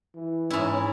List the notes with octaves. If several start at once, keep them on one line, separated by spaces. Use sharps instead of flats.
E3
G#2 C#4 E4